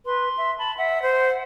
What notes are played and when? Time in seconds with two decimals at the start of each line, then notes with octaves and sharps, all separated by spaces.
0.06 B4 C6
0.37 E5
0.58 A5 B5
0.78 E5 F#5
1.02 C5